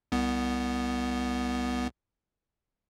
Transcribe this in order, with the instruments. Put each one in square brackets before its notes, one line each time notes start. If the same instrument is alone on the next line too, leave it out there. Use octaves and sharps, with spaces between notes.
[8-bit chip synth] C2 B3